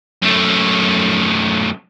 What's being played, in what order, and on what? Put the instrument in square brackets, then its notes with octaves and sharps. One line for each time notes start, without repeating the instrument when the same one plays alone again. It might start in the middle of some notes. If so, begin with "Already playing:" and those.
[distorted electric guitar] F#2 A3